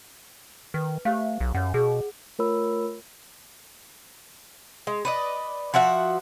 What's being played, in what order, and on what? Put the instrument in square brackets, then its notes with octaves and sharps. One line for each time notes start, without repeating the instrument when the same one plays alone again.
[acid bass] D#3 [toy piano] B4
[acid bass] A3 [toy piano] G4 C5 F5
[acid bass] B1
[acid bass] F#2 [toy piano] C#5 F#5
[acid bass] B2 [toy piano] G#4
[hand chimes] A3 F4 A#4 C#5 B5 E6
[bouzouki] G#3
B4 D5 D#5
F3 F#4 E5 F#5